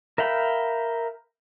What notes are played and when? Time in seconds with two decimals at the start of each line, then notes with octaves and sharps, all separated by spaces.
0.18 A#4 E5 F5 G5 B5